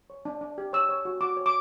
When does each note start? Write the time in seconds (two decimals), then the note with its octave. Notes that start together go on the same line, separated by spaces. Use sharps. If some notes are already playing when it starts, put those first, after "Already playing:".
0.10 C#5
0.25 D4
0.41 D4
0.58 G4
0.73 C#5 E6
0.89 C#5
1.05 F#4
1.21 F#4 D6
1.37 C#5
1.46 D6